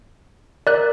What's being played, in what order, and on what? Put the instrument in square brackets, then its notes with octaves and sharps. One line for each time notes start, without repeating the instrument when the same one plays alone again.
[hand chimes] A#4 [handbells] D5 F#6